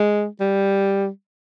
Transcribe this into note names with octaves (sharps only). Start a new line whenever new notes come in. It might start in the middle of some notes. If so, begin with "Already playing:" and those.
Already playing: G#3
G3